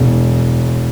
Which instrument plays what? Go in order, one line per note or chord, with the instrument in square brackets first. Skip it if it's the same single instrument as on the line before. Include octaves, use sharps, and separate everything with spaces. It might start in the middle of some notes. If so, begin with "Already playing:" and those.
Already playing: [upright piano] E1